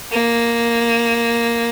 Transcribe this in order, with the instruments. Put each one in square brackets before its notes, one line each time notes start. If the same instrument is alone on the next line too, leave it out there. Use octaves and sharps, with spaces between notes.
[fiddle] A#3